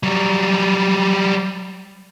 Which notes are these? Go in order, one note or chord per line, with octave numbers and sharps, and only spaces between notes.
F#3 G3